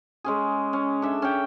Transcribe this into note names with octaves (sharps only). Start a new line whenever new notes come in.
G#3 C#4 G#4
C#4
D4 A4 E5
C#4 G5